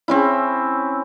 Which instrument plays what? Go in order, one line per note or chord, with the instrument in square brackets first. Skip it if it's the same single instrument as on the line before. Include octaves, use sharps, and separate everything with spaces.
[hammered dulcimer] C4 C#4 E4